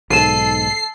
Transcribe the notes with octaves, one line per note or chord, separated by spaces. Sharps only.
B1 G#2 A4 C7 D#7 E7